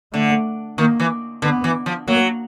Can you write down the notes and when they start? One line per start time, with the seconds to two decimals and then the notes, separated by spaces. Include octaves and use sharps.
0.13 D3 A3
0.78 D#3 A#3
1.00 E3
1.42 D3 B3
1.64 E3
1.86 F3
2.07 F#3 A#3